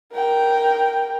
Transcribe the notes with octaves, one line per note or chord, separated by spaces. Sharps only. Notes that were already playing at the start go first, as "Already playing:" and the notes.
A#4 G5